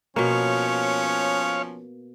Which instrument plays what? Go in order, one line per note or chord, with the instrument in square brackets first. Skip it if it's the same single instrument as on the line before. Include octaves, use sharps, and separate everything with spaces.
[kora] B2 A#3 [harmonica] F3 C#4 [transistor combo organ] C#5 F5